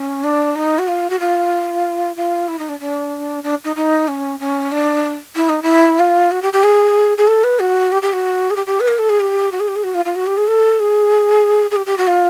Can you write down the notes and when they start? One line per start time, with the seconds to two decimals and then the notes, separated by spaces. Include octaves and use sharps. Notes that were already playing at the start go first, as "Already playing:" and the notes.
Already playing: C#4
0.24 D4
0.56 D#4
0.79 F#4
0.88 F4
1.10 F#4
1.20 F4
2.16 F4
2.48 E4
2.59 D#4
2.69 D4
2.80 D4
3.44 D4
3.65 D#4
3.76 D#4
4.08 C#4
4.40 C#4
4.72 D4
5.36 E4
5.49 D#4
5.63 E4
5.99 F4
6.31 F#4
6.42 G4
6.53 G4
6.64 G#4
7.18 G#4
7.27 A4
7.44 B4
7.59 F#4
7.92 G4
8.02 G4
8.13 F#4
8.50 G#4
8.56 G4
8.67 G4
8.80 B4
8.88 A#4
8.99 A4
9.09 G#4
9.20 G4
9.52 F#4
9.60 G#4
9.68 G4
9.76 G#4
9.84 F#4
9.94 F4
10.05 F4
10.16 F#4
10.27 G4
10.37 G#4
10.48 A4
10.80 G#4
11.71 G#4
11.76 G4
11.86 G4
11.98 F#4
12.07 F4